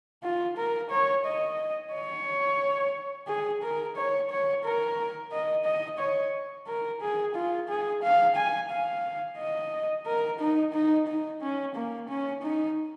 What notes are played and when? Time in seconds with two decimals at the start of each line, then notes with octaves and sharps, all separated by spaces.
0.23 F4
0.57 A#4
0.91 C#5
1.25 D#5
1.93 C#5
3.28 G#4
3.62 A#4
3.97 C#5
4.30 C#5
4.64 A#4
5.32 D#5
5.65 D#5
5.99 C#5
6.67 A#4
7.01 G#4
7.35 F4
7.69 G#4
8.03 F5
8.36 G#5
8.70 F5
9.38 D#5
10.06 A#4
10.39 D#4
10.73 D#4
11.07 D#4
11.41 C#4
11.75 A#3
12.09 C#4
12.43 D#4